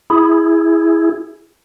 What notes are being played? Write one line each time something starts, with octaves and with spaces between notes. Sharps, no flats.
E4 G#4